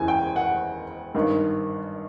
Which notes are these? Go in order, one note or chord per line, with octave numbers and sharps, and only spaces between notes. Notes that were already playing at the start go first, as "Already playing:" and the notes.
Already playing: F#1 E2 C#3 E3 G#5
G5
F#5
G#1 G2 D#3